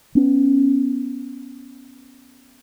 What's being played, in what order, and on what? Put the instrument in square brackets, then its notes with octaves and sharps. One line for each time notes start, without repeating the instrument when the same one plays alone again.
[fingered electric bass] B3 C#4